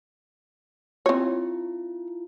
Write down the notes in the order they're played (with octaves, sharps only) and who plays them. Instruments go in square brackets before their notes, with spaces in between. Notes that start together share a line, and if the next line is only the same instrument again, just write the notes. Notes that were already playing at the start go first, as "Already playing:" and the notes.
[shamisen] C4 C#5 [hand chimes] E4 F4